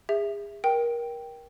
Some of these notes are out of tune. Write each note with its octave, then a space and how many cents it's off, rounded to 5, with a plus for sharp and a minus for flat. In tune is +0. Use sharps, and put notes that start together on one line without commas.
G#4 -35 E5 +0
A#4 +25 G5 +0